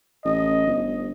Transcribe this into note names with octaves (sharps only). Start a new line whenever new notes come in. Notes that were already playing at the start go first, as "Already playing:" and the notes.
A1 D#5
G1